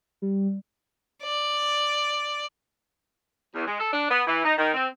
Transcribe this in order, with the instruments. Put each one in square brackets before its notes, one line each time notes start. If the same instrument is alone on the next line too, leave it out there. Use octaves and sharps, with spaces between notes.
[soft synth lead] G3
[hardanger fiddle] D5
[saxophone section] E2
G#3
A4
D4
B3
E3
D#4
D#3
C4